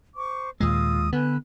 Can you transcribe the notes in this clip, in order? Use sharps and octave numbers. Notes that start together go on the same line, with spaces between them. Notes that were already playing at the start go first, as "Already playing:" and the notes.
C5 C#6 D6
D#2 A#2 G#3 F4 D#6 E6
D3 B3 B4 G#5 F#6